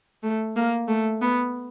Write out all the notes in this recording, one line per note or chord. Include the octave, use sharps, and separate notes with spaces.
A3
A#3
A3
B3